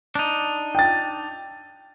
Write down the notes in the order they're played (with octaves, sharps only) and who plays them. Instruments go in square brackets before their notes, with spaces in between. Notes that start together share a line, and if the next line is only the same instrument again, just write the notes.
[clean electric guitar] D4 D#4
[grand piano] G5 A6